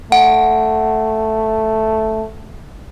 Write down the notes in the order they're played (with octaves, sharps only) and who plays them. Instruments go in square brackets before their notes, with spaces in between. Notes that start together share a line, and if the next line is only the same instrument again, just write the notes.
[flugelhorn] A3 [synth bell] F#5